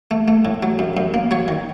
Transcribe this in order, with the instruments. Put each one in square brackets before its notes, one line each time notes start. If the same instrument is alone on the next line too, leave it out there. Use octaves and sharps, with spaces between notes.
[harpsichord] A3
A3
A2
F#3
F#2
F#2
A#3
F#3 C#5
D#3